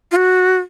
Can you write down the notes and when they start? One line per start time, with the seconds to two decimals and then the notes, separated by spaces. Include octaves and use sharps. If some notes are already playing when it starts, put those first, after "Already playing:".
0.12 F4
0.16 F#4